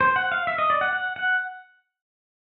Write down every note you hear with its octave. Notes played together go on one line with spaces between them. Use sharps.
C5
F#5
F5
E5
D#5
D5
F#5
F#5
F#5